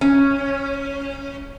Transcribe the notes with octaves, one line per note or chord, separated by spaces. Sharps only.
C#4